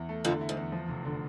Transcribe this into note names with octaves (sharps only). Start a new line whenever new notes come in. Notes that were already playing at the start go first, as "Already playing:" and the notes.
Already playing: E2 E4
A3
F2 D3 F3
E4
G#2
E2
F3
F1
D3